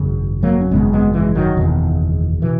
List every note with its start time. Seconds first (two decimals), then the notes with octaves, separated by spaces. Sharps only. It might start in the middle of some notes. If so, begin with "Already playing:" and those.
Already playing: G#1 F#2 C#3
0.43 F#3 A#3
0.61 C#4
0.71 G#1 F#2 C#3 G#3 B3
0.93 G#3 B3
1.14 E3 G#3
1.35 D#3 F#3
1.57 F#1 E2 B2 D#3
2.42 B2 E3